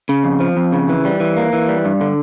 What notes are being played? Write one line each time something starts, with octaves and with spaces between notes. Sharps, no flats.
C#3
F2
F3
F2
C#3
E3
G3
E3
A#3
E3
G3
G2
D3